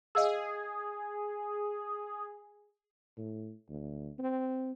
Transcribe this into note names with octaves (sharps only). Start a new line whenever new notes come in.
G#4 D#5 F5 E6
A2
D2
C4